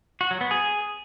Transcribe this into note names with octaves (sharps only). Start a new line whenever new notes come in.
F#4
F#3
B3
G#4